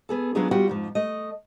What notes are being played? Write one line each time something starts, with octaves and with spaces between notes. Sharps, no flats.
B3 G#4 A4
F#3 B3 C#4 D4 F4 G#4
G3 B3 F4 F#4 F#5 G5
F2 G#2 F3
A3 D#5